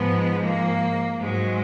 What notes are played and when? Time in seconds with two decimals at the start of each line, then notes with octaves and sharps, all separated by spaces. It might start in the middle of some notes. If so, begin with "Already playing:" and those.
Already playing: G#2 F3 G#3 B3
0.45 A#3
1.20 G#2 F#3 G#3